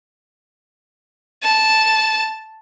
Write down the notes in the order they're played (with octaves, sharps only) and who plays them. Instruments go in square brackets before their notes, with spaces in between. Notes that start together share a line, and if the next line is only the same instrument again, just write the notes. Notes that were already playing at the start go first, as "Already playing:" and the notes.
[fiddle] A5